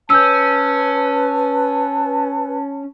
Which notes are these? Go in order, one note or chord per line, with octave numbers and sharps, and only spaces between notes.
C#4 B4 A5 E6 G6